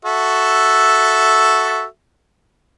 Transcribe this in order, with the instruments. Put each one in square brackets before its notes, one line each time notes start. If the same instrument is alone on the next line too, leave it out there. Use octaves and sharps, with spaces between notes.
[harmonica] F#4 A4 E5